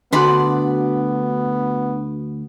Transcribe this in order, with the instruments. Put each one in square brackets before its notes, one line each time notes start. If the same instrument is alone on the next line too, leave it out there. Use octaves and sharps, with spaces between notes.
[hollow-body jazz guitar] D2 D3 [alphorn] B3 [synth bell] D4 F#4 [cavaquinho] D5 B5 C6